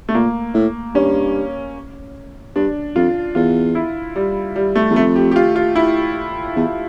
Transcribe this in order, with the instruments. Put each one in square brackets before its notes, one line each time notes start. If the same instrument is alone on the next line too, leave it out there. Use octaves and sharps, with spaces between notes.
[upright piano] A3
[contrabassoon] A#2 [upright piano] A#3
[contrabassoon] A2
[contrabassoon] G2 [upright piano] C#4
[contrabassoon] G2 [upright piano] D4
[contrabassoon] F2 [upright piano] F4
[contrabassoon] E2 [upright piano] F4
[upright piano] E4
G3
G3
A3
[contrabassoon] E2
[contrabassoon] F2 [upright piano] A3
[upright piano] G4
G4
F4
F4
E4
[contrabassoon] E2